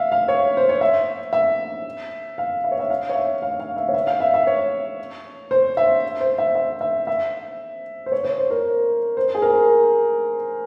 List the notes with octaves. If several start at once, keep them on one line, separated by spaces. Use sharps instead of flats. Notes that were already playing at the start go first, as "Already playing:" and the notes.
Already playing: E5 F5
F5
C#5
C5
C#5
E5
E5
F5
E5
C#5
E5
F5
C#5
E5
F5
F5
E5
C#5
E5
F5
E5
E5
C#5
C5
E5
C5
E5
E5
E5
E5
C5
C#5
C#5
C5
A#4
C5
G#4
A#4